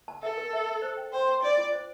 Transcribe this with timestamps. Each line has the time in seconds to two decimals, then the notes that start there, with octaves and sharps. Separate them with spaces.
0.08 A5
0.23 A4 E5
0.37 A#4
0.53 E5
0.68 E5
0.82 C5
0.97 G5
1.13 C5 G5
1.27 G5
1.43 D4 D5
1.57 F4
1.72 C5